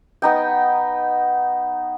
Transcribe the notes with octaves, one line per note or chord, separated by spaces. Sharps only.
B3 D#4 G5